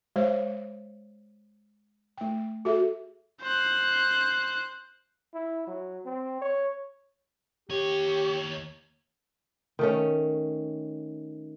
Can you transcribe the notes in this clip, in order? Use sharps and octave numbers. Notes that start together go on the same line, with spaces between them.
G#3 C5 C#5 F5
A3 G5
F#4 G#4 A4 E5
C5 F#6
E4
F#3
C4
C#5
D#2 G4 C#5
D#3 A3 C#4